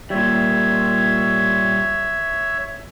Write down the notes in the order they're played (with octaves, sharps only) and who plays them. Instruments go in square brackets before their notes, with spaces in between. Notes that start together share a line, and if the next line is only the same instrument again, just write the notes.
[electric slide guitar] A#2 G3 [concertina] C#5 E5